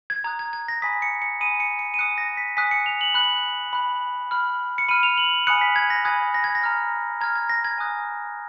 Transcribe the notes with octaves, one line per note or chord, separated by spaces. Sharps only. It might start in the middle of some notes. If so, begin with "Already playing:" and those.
G#6
A#5 D#6 F#6 G#6
G#6
G#6
A#6
G#5 B5 D#6 B6
C#7
C#7
G#5 B5 D#6 D#7
C#7
C#7
D#7
G#5 D#6 F#6 C#7
A#6
B6
G#5 D#6 F#6 B6
C#7
F7
F#7
B5 F#6 F#7
B5 F#6
B5 F6
C#7
B5 F6 D#7
F7
F#7
G#5 B5 D#6 F#6 C#7
B6
G#6
A#6
G#5 B5 D#6 F#6 G#6
A#6
G#6
A#6
A#5 F6
A#5 F6 G#6
G#6
A#6
G#6
G#5 D#6 F#6